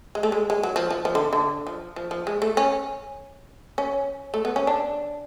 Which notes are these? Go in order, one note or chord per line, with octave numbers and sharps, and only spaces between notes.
G#3
A3
G#3
G#3
F#3
F3
F3
F3
D3
D3
F3
F3
F3
G#3
A3
C#4
C#4
A3
B3
C#4
D4